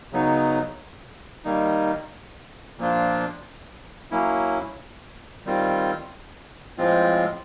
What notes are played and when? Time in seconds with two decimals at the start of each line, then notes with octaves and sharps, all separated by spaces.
0.12 C#3 F#3 B3 D#4
1.45 D#3 G3 A#3 D#4
2.78 A#2 F3 A#3 D4 F4
4.11 F#3 A#3 C#4 E4
5.45 D#3 G3 C4 F4
6.78 A2 F3 G#3 C4 F4